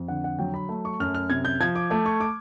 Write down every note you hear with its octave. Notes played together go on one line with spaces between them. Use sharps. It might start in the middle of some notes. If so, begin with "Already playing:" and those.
Already playing: F2
D3 F#5
F#5
F#3 G5
B5
A3
C#6
F#2 F6
F6
C3 G#6
G6
F3 G#6
D6
A3 D6
C#6
D6